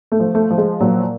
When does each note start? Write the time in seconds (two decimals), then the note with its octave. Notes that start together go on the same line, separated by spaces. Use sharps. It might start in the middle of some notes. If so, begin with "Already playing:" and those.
0.12 A3
0.20 F3
0.35 A3
0.50 F3
0.58 G#3
0.80 A#2 F#3